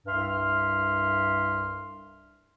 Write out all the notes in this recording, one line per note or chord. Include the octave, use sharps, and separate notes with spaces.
C2 G2 E5 C6 F6